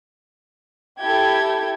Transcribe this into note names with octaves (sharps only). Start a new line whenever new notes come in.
E4 G4 A4 G5 G#6